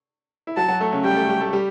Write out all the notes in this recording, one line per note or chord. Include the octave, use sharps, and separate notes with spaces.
E4
F#3 F#4 A5
F#3 F#4
A3 A4
C#3 C#4
G3 G4 G5
A3 A4
G3 G4
A3 A4
G3 G4